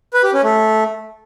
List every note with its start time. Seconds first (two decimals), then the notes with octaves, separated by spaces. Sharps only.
0.14 B4
0.24 G4
0.34 C#4
0.44 A3